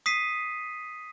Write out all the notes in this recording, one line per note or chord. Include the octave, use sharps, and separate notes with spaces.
D#6 B6 C7 D#7